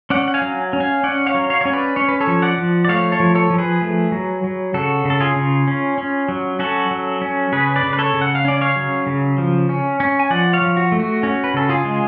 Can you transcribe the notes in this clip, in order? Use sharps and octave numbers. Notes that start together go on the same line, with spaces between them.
C#4 D5 F#5
F#5
F5 G#5
F#3
C#4
F5 G#5
C#4 D5 F#5
C#5 F5
F#3
C#5 F5
C#4 C#5
B4 D5
C#4 C#5
B4
A4 C#5
F3
D5 F#5
F3
D5
A3 C#5 F5
A4 C#5
F3
A4 C#5
F3
G#4 B4
A3
F#3
F#3
C#3 F#4 A4
C#3
A4
F4 G#4
C#3
C#4
C#4
F#3
C#4 F#4 A4
F#3
C#4
C#3 G#4 B4
B4 D5
C#3
B4
A4 C#5
C#3
F#5
F5
C#4 D5
C#5 F5
F#3
C#3
F3
C#4
C#4
G#5
F3 D5 F#5
C#5 F5
F3
F#4
A3
F#4
C#4 F#4
B4
C#3 A4
F4 G#4
G#3